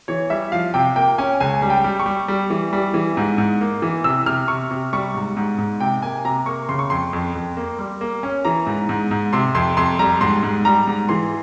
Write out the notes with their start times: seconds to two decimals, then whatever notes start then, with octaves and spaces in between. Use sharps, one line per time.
0.08 E3 C#5
0.30 G3 E5
0.52 F3 F5
0.74 C3 G5
0.96 A#3 G5
1.18 C#4 G#5
1.40 C#2 G#5
1.62 G3
1.70 G5
1.84 G3
2.00 C#6
2.06 G3
2.28 G3
2.50 E3
2.73 G3
2.94 E3
3.17 G#2
3.38 G#2
3.61 A#3
3.82 E3
4.04 C3 E6
4.26 C3 F6
4.48 C3 C#6
4.71 C3
4.93 G3 C#6
5.14 G#2
5.37 G#2
5.58 G#2
5.80 C3 G5
6.02 A#3 G#5
6.25 C3 A#5
6.46 A#3 C#6
6.69 C#3 C6
6.79 C#6
6.90 F2 C6
7.13 F2
7.35 F2
7.57 A#3
7.79 G3
8.01 A#3
8.23 C#4
8.45 E3 A#5
8.67 G#2
8.89 G#2
9.11 G#2
9.33 C3 C6
9.55 F2 C6
9.77 F2 C6
9.99 G3 A#5
10.21 G#2 C6
10.43 G#2
10.65 G3 A#5
10.87 G#2
11.09 E3 C6